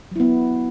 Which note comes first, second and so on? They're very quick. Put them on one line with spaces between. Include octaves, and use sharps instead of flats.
F#3 E4 B3